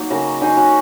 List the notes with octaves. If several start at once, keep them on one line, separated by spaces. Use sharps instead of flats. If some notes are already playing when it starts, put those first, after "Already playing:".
Already playing: F#3 A#3 D#4
C#3 F#4 A#4
F#3 D#4 G#4
C#4 F#4